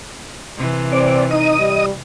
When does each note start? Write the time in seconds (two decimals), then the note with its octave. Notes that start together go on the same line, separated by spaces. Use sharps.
0.57 C3 E3
0.92 C4 D5
1.31 D#4 D#5 D#6
1.59 G3